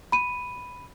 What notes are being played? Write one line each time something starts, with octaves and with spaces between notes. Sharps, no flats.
B5 D#7